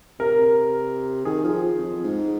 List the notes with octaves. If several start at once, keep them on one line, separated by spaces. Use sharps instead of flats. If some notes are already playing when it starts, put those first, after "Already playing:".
C3 A#4
D#3 G#4
F3
F2
G#2